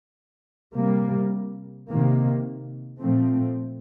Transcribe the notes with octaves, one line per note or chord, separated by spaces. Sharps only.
C3 G3 A#3
C3 D#3 A#3
A#2 F3 A3 C4